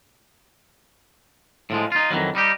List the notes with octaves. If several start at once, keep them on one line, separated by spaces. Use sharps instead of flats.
A2 F3 G#3
D#4 F4
F2 D#3 E3 F#3
G3 D#4 G4